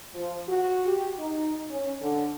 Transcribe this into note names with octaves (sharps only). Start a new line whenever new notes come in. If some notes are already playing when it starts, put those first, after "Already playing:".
F3
F#4
G4
D#4
C#4
D3